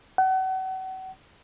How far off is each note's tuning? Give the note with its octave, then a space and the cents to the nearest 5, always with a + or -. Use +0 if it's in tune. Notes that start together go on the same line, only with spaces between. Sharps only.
F#5 +35